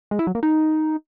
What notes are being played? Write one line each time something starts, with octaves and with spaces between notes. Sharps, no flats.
G#3
E4
F#3
A#3
D#4